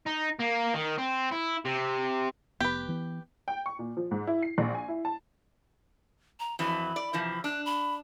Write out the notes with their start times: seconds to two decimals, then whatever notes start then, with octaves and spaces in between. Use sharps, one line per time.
0.06 D#4
0.39 A#3
0.74 D#3
0.98 C4
1.31 E4
1.65 C3
2.60 F1 B3 G4 B4
2.89 E3 B3
3.48 G5
3.66 C#6
3.79 A#2
3.97 F3
4.11 G#2
4.27 E4
4.43 C7
4.58 A#1
4.75 G#5
4.88 E4
5.05 A5
6.40 A#5
6.59 F2 E3 F#3 B5
6.96 D5
7.13 C3 E3 F3
7.44 D4 F#6
7.66 B5